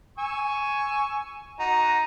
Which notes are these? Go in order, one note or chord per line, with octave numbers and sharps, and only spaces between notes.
G#5 C#6 E6
D#4 F#4 A#5